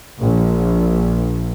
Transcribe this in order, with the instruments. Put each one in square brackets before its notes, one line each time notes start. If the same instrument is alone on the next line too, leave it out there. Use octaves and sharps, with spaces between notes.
[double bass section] A#1